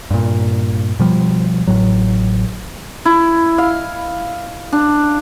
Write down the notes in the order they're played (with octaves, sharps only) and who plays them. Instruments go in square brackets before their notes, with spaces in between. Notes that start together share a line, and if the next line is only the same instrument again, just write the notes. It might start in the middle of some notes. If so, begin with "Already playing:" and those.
[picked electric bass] G2 A#2
B2 F3 G3
A1 A2 F#3
[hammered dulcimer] E4
F5
D4